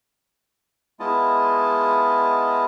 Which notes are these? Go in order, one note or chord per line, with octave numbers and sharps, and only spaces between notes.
G#3 B3 E4 F4 D#5 A5